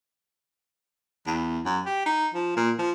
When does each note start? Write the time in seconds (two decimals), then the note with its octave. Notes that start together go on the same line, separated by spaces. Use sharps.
1.27 E2
1.65 F#2
1.86 G4
2.06 D#4
2.34 F3
2.57 A#2
2.79 F3